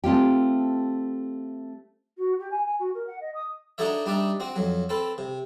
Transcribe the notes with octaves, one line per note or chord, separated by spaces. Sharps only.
A3 C4 F4 G4
F#4
G4
G#5
G#5
F#4
A#4
F#5
D#5
D#6
D4 D#4 F#4 A4 C#5 E5
G3 D4 D#4 D5 E5
C4 F#4
F2 F#3
C4 A4 B4
C3